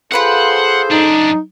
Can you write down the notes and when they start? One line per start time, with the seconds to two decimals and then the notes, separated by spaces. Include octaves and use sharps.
0.12 F4 G#4 A4 B4 C5 F5 F#5
0.91 F#2 D4 D#4